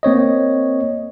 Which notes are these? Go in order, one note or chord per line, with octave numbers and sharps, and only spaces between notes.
A#3 C4 C#5 D#5